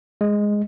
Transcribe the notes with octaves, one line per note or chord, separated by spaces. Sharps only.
G#3